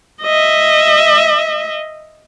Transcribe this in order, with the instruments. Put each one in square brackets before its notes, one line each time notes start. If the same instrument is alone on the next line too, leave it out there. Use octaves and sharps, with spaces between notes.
[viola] D#5 E5